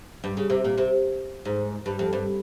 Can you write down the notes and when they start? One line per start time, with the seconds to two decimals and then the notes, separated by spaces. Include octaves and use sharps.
0.24 G2
0.37 C#3
0.50 C3
0.64 A#2
0.78 C3
1.45 G#2
1.86 G2
1.99 F2
2.13 G2